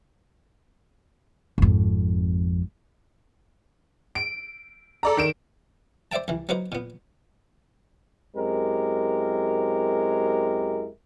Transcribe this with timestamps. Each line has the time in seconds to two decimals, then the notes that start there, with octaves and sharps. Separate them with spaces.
1.58 G#1 F2
4.15 D7
5.03 A4 D5 A#5
5.17 D#3 D7 E7
6.12 C5 D5 E5 G5 A5
6.28 C2 E3
6.49 F#3 A#3 D#4 B4 C5
6.72 A#2 B3
8.36 F#2 G#3 C4 E4 G4 A#4